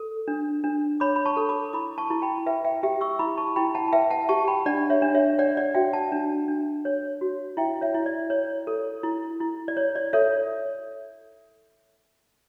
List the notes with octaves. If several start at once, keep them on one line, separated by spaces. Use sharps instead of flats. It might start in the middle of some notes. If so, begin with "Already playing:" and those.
Already playing: A4
D4
D4
C#5 B5 D6
B5
A5 C#6
A4
B5 D6
E4 B5 D6
A5 C#6
E4
G5 B5
B4 E5 G5
E5 G5
G4 E5 G5
C#6 E6
E4 B5 D6
A5 C#6
E4 G5 B5
F#5 A5
A5
B4 E5 G5
F#5 A5
G4 A5 C#6
G5 B5
D4 D5 F#5
C#5 E5
D4
C#5 E5
C#5 D5 F#5
D5 F#5
F#4 E5 G5
F#5 A5
D4
D4
C#5
F#4
E4 E5 G5
C#5 E5
E4
D5
C#5
A4
E4
E4
D5
C#5
D5
A4 C#5 E5